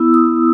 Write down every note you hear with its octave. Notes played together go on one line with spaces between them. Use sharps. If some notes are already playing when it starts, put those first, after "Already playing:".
Already playing: B3 E4 E6
D#6